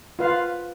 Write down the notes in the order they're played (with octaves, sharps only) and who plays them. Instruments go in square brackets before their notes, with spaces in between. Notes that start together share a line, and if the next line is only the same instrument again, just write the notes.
[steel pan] F4 B4 F5